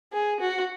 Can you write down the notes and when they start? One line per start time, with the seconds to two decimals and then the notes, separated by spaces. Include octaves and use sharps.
0.13 G#4
0.40 F#4